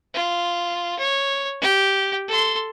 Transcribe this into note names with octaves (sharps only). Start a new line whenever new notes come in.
F4
C#5
G4
A4 C6